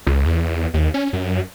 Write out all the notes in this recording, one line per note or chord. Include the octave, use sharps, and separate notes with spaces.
C#2
E2
D#2
C#4
F#2